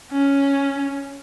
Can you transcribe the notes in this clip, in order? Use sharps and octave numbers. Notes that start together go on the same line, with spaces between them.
C#4